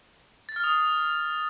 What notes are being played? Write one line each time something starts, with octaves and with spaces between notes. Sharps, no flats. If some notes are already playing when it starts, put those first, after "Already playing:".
A6
F6
D#6